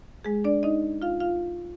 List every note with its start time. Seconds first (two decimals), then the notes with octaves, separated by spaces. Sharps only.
0.25 G#3 G#4
0.44 D4 D5
0.63 D#4 D#5
1.02 F4 F5
1.20 F4 F5